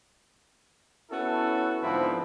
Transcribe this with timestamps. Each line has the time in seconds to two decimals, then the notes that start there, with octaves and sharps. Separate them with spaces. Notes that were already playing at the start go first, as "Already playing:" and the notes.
1.10 B3 C#4 E4 F#4 A4
1.82 G#2 D3 F3 B3 C4 E4